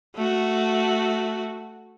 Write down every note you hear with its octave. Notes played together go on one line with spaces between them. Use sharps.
A3 F#4